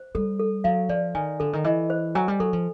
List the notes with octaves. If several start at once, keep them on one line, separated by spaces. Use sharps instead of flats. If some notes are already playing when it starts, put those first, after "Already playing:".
Already playing: C5
G3 A4
A4
F#3 F5
F3 D5
D#3 G#5
D3 A4
D#3
E3 D#5
C5
F#3 G#5
G3
F#3 A4
F3